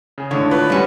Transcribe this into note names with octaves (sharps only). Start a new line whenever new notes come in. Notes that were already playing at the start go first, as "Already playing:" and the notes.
C#3 G#4
G#1 A2 D3 C#5
F4 B4
G3 G#3 C#4 F#4